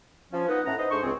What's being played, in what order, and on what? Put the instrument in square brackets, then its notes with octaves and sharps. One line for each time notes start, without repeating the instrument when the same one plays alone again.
[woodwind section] F3 C#4
B3 D#4 F#5
A2 A3 C#4 F#5 A#5
D#4 B4 C5 D#5
G#2 A3 D4 C5 C#6
C#2 C4 G#4